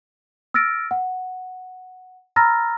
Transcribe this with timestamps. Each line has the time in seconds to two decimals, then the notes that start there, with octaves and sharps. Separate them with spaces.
0.54 E6 F6 A6 A#6 D7
0.91 F#5
2.36 A#5 B5 E6 F6 A6 A#6